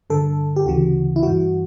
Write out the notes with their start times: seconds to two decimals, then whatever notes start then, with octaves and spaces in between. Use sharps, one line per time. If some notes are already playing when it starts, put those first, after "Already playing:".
0.10 G2 D3 A4
0.56 G4
0.66 D2 C#3 E3 F#4
1.16 E4
1.23 G2 E3 F#4